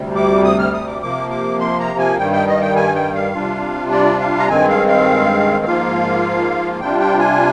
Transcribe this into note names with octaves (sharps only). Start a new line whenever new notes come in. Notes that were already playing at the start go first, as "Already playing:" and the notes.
Already playing: D2 C3 G3
D6
D#6
F6
D#6
D6
C3 F3 A#3 D6
D6
C6
A#5
G#5
G2 D#3 G3 G5
G5
D#5
G5
G#5
G5
F5
C3 G3 D4 F4
D5
F5
A#5
G2 D#3 G#3 C4 G#5
F5
F5
G#2 F3 A#3 F4 F5
C3 G3 D4 F4 G5
G5
G#5